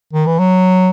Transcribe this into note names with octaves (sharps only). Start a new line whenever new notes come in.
D#3
E3
F#3